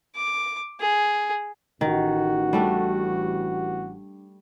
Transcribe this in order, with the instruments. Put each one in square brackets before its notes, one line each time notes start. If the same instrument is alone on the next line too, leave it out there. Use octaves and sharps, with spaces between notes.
[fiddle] D6
G#4
[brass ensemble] A1 F#4 [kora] D#3
[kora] G3 A3 D4